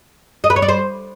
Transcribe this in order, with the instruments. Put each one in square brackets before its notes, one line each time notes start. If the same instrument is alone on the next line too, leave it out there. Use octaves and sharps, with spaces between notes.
[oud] D#5
B4
C#5
D5
C5